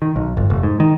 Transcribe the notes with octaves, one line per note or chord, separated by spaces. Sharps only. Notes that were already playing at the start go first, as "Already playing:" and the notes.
D#3
B1
G1
F1
G#2
D#3